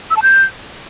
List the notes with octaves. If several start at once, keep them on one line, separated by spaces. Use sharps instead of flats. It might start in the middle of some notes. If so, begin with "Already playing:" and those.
E6
A5
G6